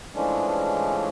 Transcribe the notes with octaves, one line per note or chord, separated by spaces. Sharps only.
E3 F3 G#3 A3 C#4 D4